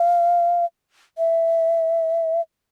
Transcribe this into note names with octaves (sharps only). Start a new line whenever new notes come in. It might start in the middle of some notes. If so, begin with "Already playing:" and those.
Already playing: F5
E5